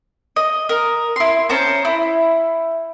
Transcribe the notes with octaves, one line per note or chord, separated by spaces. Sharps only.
D#5
A#4
E4 C6
C#4 C5 A5 A#5
E4